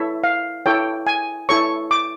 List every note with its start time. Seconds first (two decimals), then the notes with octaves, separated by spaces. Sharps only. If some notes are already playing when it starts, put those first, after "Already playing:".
Already playing: E4 A4 C#5 E5
0.24 F5
0.66 E4 A4 C#5 G5
1.07 G#5
1.49 E4 A4 C#5 C#6
1.91 D6